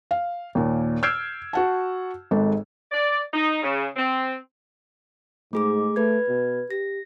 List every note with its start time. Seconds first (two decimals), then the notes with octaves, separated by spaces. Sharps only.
0.11 F5
0.55 D#2 A#2
1.03 E6 F6 G6 G#6 C7 D7
1.53 F#4 F#5 A5
2.31 G#1 G#2 A4
2.92 D5
3.33 D#4
3.62 C#3
3.96 C4
5.53 G#2 A3 G#4 D6
5.96 A3 B4 G#6
6.29 B2
6.71 G4 A#6